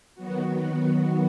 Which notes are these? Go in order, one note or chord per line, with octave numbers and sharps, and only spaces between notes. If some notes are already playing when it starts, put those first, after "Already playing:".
D#3 F#3 B3 F#4